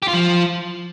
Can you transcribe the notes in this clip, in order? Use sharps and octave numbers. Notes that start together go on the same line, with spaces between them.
G4
F4
F3